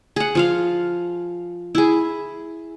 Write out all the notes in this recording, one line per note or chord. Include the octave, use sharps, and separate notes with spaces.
G#4 F#5
F3 F4 F5
E4 G#4